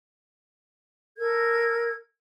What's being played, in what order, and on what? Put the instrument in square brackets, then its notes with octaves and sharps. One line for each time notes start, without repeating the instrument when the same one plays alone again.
[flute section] A4 A#4 G#6